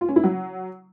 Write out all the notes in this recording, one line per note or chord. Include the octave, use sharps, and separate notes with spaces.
F4
C#4
E4
F#3